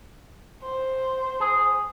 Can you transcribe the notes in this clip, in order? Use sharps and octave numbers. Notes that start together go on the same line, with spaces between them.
C5
G#4